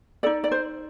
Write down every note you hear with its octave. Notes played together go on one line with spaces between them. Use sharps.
D#4 A4 D5
D5
C5